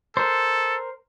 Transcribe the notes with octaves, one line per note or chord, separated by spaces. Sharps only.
A4 A#4 C5